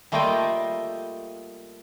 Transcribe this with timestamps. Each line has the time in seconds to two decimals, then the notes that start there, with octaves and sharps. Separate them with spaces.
0.12 G3 A3 A#3 F4 D#5 G5